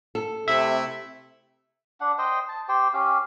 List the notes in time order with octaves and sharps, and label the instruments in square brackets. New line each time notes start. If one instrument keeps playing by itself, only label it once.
[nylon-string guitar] A4
[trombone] C3 [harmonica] A3 E4 [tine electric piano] E5
[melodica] D4 F#5
C5 D#5 G5
A5
G4 C5 G5
C#4 G4 F5